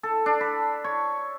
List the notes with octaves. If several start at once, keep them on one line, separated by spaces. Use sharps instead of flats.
A4
D4
B5
C#5